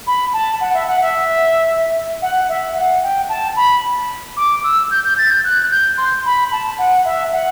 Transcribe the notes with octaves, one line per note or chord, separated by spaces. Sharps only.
B5
A5
F#5
E5
F#5
E5
F#5
E5
F#5
G5
A5
B5
D6
E6
G6
G6
A6
G6
F#6
G6
C6
B5
A5
F#5
E5
F#5